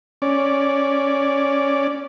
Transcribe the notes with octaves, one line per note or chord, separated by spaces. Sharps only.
C#4 D5